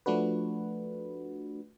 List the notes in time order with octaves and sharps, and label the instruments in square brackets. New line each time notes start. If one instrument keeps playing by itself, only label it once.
[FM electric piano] F3 A3 D4 F#4 B4